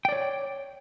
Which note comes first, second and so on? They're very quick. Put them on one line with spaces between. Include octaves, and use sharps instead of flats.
G5 D5 C#5